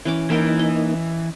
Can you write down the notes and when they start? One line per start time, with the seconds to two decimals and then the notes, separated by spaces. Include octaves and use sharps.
0.05 E3 C#4 D6
0.30 E3 A#3 D#4 A#4 G5
0.59 D#5